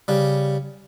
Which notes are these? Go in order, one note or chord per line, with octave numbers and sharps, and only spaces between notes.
C#3 G3